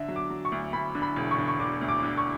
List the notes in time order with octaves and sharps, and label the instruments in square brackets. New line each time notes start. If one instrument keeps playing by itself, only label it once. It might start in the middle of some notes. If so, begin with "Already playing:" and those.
Already playing: [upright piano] D3 E5
F#3
D6
F#3
C#6
D2
D2 B5
D3
B5
E1
C#6
D3
C#6
D3 D6
D2
D6
D3
C#6